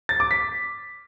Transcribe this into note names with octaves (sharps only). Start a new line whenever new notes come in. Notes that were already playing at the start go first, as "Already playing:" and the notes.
A6
D6
B6